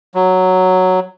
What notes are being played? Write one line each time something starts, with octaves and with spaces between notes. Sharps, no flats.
F#3